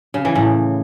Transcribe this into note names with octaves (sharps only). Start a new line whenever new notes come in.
C#3
E3
A2